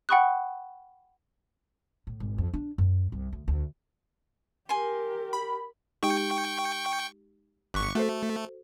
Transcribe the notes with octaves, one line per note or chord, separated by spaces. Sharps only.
F#5 G5 B5 C#6 D#6 F#6
A2
G#1
F2
D4
F#2
C2
D2
D2
G4 A#4 G#5 C6
B5
G#3 D#4 G4 G5 C#6
G1 C#6 D6 F#6 B6
A3 F#4 A4 C5